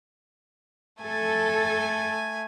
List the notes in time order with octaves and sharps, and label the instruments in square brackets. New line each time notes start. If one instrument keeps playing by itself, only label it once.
[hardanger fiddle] A3 G#5 [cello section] A4